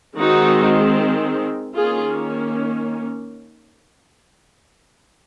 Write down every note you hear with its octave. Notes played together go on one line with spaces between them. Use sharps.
D#3 G#3 C4 D#4 F#4
D#3 A#3 C#4 F4 G#4